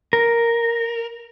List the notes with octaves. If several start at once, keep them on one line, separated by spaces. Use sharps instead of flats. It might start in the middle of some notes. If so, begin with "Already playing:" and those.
A#4